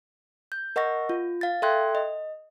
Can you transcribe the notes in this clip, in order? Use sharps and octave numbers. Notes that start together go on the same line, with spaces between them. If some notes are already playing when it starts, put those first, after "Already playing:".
G6
A#4 D#5 F#5 C#6 A#6
F4
F5 A6
A4 E5 G5 C6 F#6 G#6
D#5